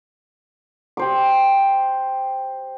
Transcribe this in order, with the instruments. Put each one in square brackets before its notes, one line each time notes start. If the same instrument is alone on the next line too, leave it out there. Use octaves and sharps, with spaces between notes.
[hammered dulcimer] G4 C5 D6